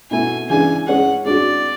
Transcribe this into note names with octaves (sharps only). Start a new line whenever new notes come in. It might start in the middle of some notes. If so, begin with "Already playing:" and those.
B2 A3 E4 G#5
C#3 E3 G#3 D4 G#5
G#3 C#4 G#4 F#5
G#3 D4 F#4 D5